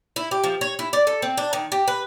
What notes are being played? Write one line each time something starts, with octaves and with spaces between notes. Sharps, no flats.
E4
G4
F3
C#5
E4
D5
A4
C4
D4
D#3
G4
B4